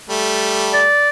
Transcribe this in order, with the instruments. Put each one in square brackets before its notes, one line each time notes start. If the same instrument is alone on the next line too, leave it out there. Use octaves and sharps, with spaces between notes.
[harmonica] G3 A3
[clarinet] D5